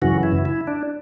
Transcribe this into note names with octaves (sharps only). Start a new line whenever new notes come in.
F#2 C#3 E3 F#4
E4
E4
D4